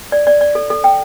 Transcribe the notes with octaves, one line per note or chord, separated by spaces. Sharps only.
D5
D5
D5
A4
A4
G5